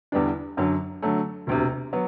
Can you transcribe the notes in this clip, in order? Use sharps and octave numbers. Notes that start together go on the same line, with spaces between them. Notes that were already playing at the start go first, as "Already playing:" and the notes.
E2 D3 G3 B3 D4
F#2 D3 F#3
D3 F#3 A3
E1 D2 C3
F#3 B3